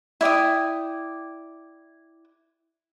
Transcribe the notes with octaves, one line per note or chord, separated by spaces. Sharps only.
E4 D5 G5 D#6